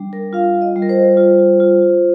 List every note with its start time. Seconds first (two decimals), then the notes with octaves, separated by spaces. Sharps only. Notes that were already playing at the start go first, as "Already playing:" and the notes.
Already playing: G3 D4
0.13 A#4
0.33 F4 F5
0.62 D#5
0.76 G3
0.82 A#4
0.89 C5
1.17 F4
1.60 F4